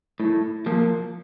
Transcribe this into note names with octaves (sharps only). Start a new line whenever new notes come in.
A2
F3 A#3